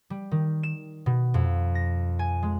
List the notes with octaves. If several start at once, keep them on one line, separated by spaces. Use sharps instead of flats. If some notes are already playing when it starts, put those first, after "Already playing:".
G3
D#3
E7
B2
F2
A#6
G#5
G#3